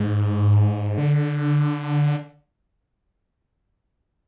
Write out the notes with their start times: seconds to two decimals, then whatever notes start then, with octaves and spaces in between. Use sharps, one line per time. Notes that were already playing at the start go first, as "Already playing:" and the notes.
Already playing: G#2
0.98 D3